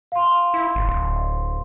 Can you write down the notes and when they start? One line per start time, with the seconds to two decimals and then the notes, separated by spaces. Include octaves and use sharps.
0.12 F5 C6
0.54 E4
0.75 G#1
0.87 D1